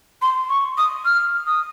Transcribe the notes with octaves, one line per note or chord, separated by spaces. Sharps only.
C6
C#6
D#6
F6
D#6